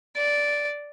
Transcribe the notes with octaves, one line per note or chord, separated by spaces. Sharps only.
D5